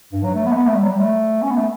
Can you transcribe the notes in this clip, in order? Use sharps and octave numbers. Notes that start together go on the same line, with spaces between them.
G2
F#3
A3
B3
A3
B3
A3
G3
F#3
G3
A3
C#4
B3
A3